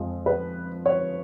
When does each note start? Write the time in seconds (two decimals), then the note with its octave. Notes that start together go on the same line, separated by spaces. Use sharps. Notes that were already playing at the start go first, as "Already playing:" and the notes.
Already playing: F2 F3 G#3
0.26 B4
0.86 C#5